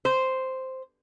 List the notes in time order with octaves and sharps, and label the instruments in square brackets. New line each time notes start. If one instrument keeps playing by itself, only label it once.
[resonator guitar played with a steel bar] C5